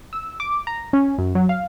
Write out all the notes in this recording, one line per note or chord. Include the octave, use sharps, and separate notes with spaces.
E6
D6
A#5
C#4
F#2
F#3
F5